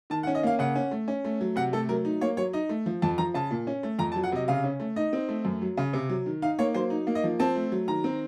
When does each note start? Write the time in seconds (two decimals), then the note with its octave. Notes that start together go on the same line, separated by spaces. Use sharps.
0.10 D#3 A5
0.23 F#5
0.27 C#4
0.35 D#5
0.43 A#3 F5
0.59 C#3 F#5
0.75 C#4
0.91 A3
1.08 C#4
1.25 A3
1.41 F#3
1.56 C3 F#5
1.73 A3 A4
1.89 F#3 A#4
2.05 D#4
2.21 A#3 C#5
2.37 F#3 C#5
2.53 D#4 D#5
2.69 A3
2.86 F3
3.02 F2 A5
3.18 F3 A#5
3.34 C#3 A5
3.51 A#2
3.67 C#4
3.83 A3
3.99 F2 A#5
4.12 A5
4.16 F#3
4.23 F#5
4.32 C3 D#5
4.48 C#3 F5
4.64 C#4
4.80 A3
4.96 D#4 D#5
5.13 C4
5.29 A3
5.45 F#2
5.62 F#3
5.77 C#3
5.93 C3
6.09 F#3
6.26 D#3
6.42 D#4 F5
6.59 A#3 C#5
6.74 F#3 C5
6.90 D#4
7.07 A#3
7.15 D#5
7.24 F3
7.39 C4 A5
7.55 A3
7.72 F#3
7.88 D#3 A#5
8.04 C4